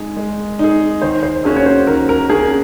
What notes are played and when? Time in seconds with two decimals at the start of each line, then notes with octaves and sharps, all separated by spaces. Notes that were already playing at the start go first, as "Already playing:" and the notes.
Already playing: G#3 D#4 G#4
0.17 G#3
0.59 D#4 G#4
1.02 D#3 C5
1.23 C5
1.44 A#3 C#4 F#4 G#4
1.56 C#5
1.66 C5
1.87 D#3 A#4
2.09 A#4
2.30 A#3 C#4 F#4 G#4